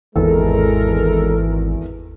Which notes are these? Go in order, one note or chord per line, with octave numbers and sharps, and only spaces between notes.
G#1 E2 G#3 A4 A#4